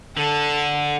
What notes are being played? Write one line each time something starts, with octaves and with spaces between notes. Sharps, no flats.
D3 A4